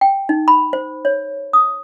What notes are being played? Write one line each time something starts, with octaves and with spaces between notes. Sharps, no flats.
G5
D#4
B5
C5
C#5
D#6